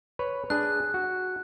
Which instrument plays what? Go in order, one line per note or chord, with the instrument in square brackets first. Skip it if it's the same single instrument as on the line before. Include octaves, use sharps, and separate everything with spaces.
[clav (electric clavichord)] B4 C#5
[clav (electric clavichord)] D4 G#4 [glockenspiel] F#6
[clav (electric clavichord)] F#4